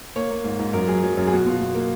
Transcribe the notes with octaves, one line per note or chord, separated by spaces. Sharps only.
A#3 C#5
A#3
G#2
G#2
F#2 A#4
F#3 G#4
F#3
F#2
G#4
B2 F#4
B2 F4
B2
A#3